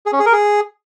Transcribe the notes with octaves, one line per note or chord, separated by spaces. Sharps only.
G#4
C#4
G#4
A#4
G#4